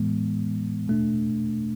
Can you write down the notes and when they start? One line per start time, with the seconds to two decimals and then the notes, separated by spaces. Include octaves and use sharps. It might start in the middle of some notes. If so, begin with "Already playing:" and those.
Already playing: A2 E3 G#3 B3
0.88 B2 A3 D4